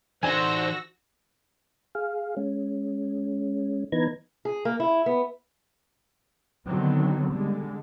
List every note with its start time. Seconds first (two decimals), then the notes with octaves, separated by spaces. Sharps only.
0.23 E3 D#4 F#4 C5 D5 G#5 E6 A#6
1.95 G#4 F5
2.37 G#3 C#4
3.92 E3 B3 D#4 B4 A#5 G#6
4.45 G#4
4.65 A#3
4.80 E4
5.06 B3
6.66 D3 D#3 F#3 B3 C4
7.31 D3 G3 G#3